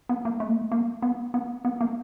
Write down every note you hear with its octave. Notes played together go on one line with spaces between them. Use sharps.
B3
A#3
A3
A#3
A3
A#3
B3
B3
B3
A#3